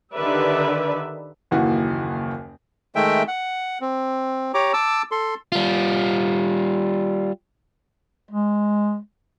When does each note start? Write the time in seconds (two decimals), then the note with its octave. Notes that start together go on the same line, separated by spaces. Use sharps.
0.16 D3 D#3 G4 B4 D5 E5
1.51 F#1 D#2 E3 F#4
2.95 D#3 G#3 A3 E5 G5
3.28 F#5
3.81 C4
4.54 G4 C#5 A#5 D6
4.73 A5 D6 E6
5.11 A4 C6
5.52 G3 F4
8.31 G#3